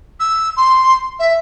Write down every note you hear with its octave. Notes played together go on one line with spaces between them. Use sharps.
E6
C6
E5